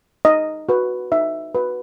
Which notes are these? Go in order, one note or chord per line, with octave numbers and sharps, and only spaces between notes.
D#4 D#5
F#4 B4
D#4 E5
F#4 B4